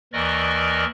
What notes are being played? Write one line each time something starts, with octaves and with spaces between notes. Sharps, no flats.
D#2 E3 A#4 D5 D#5 C#6